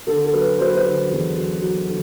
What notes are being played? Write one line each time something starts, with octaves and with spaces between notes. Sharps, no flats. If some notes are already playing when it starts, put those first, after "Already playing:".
D3 A4
A4
F#3 B4
F#3 C5
B4
C5
D3
E2
F#3
F#3
D3